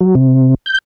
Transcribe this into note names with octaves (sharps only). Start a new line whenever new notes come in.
F#3
C3
G6